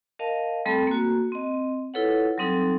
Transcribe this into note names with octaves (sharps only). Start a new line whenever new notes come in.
A#4 D#5 F5 A5
G3 A3 C4 A4 A5 B5
A#3 F#4
C4 D#5
E4 F4 A4 B4 C#5 F#5
F#3 G3 C4 D#4 A4